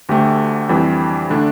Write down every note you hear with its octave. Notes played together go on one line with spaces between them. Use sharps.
D2 D3 A3 G4
F2 E3 G3
D3 A3 D4